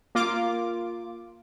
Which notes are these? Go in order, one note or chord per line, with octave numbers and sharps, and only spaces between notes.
A#3 F4 D6